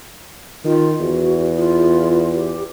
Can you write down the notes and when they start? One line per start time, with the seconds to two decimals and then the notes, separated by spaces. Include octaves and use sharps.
0.65 D#3 F4
1.00 E2 F#4
1.57 F4
2.35 G4